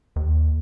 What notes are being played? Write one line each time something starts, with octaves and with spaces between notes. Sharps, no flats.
D#2